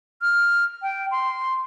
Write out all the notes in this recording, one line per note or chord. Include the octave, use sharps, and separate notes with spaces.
F6
G5
C6